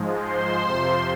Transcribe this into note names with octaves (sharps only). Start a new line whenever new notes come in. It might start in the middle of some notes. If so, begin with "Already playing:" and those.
Already playing: G#2 F3 G#3
C5 C6
F2 C3 F3